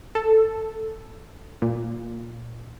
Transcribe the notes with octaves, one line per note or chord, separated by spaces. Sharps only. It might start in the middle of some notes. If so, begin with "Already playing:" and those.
A4
A#2